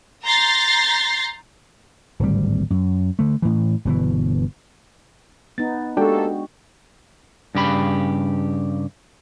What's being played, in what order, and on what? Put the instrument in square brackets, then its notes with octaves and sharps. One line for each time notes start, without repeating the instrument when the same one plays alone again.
[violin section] A#5 C6 G6 A6 A#6 C7
[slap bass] D1 G#1 G3
F#2
D3 A3
A2 E3
G1 B2 E3
[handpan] B3 D#4 [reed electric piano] A6
[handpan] G#3 F#4 [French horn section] A#3 G4 A4 [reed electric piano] D4 G5
[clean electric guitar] G2 C#3 G4 B5